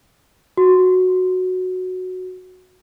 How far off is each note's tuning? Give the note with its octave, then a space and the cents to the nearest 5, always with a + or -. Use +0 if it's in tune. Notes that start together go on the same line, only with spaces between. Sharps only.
F#4 -5